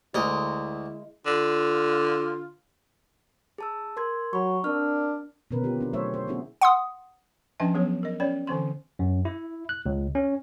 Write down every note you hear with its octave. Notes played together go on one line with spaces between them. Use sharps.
D2 G#3 E4 A#4 D#5
D3 F4
G#4 A5 E6
A#4 C6 G#6
F#3 B5 C#6
C4 D4 A#4 F6
B2 D3 D#3 C#4 A#4 B4
F4 G4
C4 D4
F#3 A3 G#4 C5 C#5 E5
C5
B3 C#4 D4 E4 F#4 G#4
F#5 C6 D#6
F3 C#4 D4 D#5 E5 A5
F#3 B3 G#4 C#5
A#4 D#5
C#4 C#5 D5 B5
D3 E3 C4 C6
F#2
E4
F#6
C#2
C#4